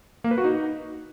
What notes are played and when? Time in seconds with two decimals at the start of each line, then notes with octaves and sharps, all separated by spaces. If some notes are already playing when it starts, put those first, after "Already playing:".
0.24 A#3
0.31 B4
0.38 F#4
0.44 D#4